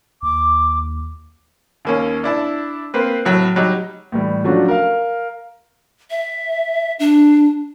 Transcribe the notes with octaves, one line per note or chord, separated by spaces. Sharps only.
D#2 D6
D#2 A#3 C#4
D4 E4 A5
A#3 C4 B4
A2 F#3 E4
F#3 G3 D#4
A2 E3 G3
F3 F#3 A3 C#4 D4 F#4
A#4 F5
E5
D4